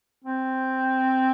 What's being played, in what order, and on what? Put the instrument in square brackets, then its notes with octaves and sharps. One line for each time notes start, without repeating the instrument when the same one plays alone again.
[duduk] C4